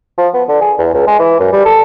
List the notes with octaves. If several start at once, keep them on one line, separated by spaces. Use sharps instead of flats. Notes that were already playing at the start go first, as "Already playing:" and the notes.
F3
B3
D3
G#4
E2
C#2
G#3
E3
F#2
G3
A4